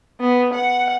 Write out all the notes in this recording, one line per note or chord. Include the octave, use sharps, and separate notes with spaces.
B3
F#5